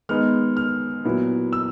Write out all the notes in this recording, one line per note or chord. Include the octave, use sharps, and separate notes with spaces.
D#3 G#3 B3 D#4 F6
F6
A#2 F#3 B3 E4
E6